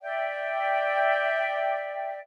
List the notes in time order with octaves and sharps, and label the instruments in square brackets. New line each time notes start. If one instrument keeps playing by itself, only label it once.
[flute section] D5 E5 G5